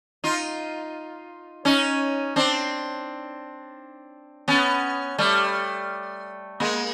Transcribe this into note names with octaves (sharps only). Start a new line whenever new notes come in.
D#4 F4
C#4 D#4
C4 D4
B3 C#4
G3 A3
G#3 A#3